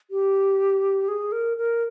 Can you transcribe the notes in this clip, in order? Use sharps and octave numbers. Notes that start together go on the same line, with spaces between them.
G4
G#4
A#4
A#4